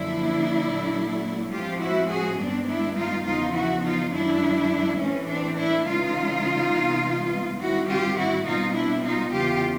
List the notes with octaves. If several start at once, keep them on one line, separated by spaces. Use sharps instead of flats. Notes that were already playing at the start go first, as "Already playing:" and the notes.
Already playing: F#2 D3 F3 A#3 D4 E4
A#2 F#3 A3
A2 F3 G#3 C4 F4 G4
E4 F#4
F#4 G#4
G2 D#3 G#3 B3 C4 D4
D4 E4
D#4 F4
E2 C#3 F3 D#4 F4
E4 F#4
D#4 F4
F#2 D#3 G#3 D4 E4
A2 E3 A3 C4 C#4
C4 D4
D4 E4
C#3 E3 G#3 D#4 F4
C3 E3 G#3 B3
G#2 D#3 G3 C4 E4 F#4
F4 G4
E4 F#4
B2 G3 C4 D#4 F4
D4 E4
D#4 F4
E2 C#3 E3 F4 G4